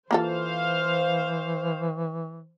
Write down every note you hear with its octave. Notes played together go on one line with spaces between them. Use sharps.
E3 A#3 F4 A4 C5 F5